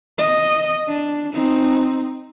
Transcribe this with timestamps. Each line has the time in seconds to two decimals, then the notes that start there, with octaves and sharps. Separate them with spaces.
0.18 D#5
0.88 D4
1.34 C4 D#4